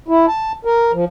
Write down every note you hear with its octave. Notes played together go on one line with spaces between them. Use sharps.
E4
A5
A#4
F3